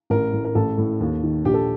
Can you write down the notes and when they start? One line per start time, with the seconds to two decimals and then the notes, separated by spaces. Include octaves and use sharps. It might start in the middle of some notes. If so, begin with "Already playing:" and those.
0.10 A1 A#4
0.33 A2
0.45 A#4
0.55 A1 A4
0.78 A2
1.00 D#2
1.23 D#3
1.45 A#1 G4
1.54 A4